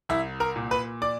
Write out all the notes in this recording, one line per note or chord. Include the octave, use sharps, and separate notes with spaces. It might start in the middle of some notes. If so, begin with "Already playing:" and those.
C2 E4 E5
A#4 A#5
A#2
B4 B5
D5 D6